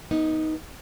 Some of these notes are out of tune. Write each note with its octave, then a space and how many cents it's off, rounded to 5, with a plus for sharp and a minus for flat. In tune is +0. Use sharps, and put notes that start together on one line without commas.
B3 -25 D#4 +10